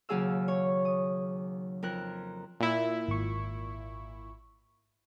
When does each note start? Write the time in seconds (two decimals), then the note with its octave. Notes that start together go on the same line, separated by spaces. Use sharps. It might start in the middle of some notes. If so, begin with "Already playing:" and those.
0.09 D#2 C#3 F#3 G#4 F5 E6
0.48 C#5
0.85 D#6
1.83 F2 A#4 F#6
2.60 A#2 E4
3.08 G#1 C#6